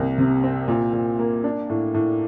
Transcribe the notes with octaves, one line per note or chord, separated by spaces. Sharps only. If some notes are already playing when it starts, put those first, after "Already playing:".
Already playing: C2 A#3
C3
C4
A#2
A#2
A#3
D4
A2
A2